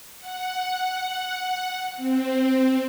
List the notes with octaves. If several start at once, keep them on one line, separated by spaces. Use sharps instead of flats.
F#5
C4